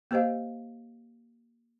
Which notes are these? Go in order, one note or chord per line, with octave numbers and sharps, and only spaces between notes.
A#3 G4 C5 D#5 F5